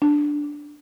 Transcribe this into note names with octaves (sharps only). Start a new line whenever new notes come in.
D4